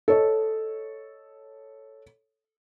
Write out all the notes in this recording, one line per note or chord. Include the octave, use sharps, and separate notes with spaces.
A4 C#5 D#5